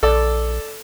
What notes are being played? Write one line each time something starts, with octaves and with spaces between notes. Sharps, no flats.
A#1 A4 D5